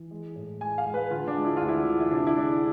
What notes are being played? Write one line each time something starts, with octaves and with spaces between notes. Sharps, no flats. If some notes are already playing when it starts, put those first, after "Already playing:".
Already playing: E3
G#3
A2
G#3 G#5
F5
G#3
B4
D3 F4
D4
G#3
E4
D2 F4
E4
D3
E4
C3 D4
E4
G#3 D4